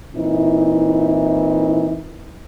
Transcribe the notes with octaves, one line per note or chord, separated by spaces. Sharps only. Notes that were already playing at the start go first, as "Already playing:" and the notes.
A#2 E3 C4 D#4 E4